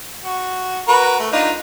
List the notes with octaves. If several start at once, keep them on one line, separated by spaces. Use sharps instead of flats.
F#4
F#4 A#4 B4
A3
D4 D#4 F4